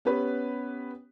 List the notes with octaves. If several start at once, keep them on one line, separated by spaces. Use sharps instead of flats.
B3 C#4 G4 B4